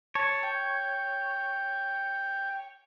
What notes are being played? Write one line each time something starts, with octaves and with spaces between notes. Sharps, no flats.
C#5 A5
G5